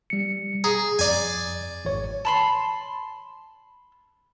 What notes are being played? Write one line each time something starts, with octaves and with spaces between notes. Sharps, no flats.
G3 C#7
G#4 A#5
F2 D5 G#5
G#1 C#5
A5 B5 C6